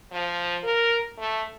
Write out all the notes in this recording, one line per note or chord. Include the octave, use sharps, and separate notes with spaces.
F3
A#4
A3